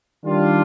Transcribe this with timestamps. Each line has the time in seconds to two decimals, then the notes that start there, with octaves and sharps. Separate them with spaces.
0.25 D#3 G3 D4 F4